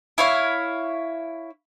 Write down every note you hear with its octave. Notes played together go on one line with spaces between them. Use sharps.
E4 C#5 F5